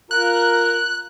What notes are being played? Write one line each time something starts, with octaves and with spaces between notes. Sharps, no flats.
F4 A#4 F#6